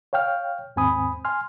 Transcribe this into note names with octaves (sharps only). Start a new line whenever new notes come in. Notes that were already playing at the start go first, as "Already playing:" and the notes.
C#5 F5 G5 F6
D#2 G#2 C4 G#5 B5 D#6
G#5 C6 F6